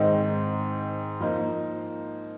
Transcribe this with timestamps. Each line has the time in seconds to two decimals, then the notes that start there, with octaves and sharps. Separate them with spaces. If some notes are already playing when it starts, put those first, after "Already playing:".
Already playing: G#2 D#3 C4 D#4
1.20 F3 A#3 D#4